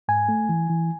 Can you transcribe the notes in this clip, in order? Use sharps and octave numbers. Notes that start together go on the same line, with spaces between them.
G#2 G#5
A3
E3
E3